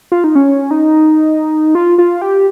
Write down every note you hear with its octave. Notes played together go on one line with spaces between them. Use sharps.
F4
D#4
C#4
D#4
F4
F4
G4